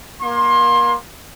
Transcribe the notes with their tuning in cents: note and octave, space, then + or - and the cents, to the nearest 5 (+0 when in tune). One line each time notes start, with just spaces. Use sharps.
A#3 +30 C6 +25